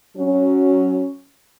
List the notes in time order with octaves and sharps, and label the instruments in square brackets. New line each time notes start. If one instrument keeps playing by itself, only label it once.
[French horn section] F#3 C#4